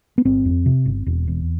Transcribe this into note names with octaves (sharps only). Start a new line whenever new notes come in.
B3
G1 C4
F2
C3
G1
E1
E2